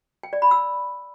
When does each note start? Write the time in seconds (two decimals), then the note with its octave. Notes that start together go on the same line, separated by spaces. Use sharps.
0.23 G5
0.33 D5
0.42 B5
0.51 E6